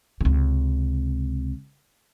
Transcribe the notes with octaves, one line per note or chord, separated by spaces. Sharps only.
C#2 C3